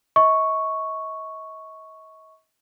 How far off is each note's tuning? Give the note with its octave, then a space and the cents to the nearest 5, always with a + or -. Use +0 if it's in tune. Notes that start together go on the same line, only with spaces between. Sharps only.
D#5 +45 C#6 +0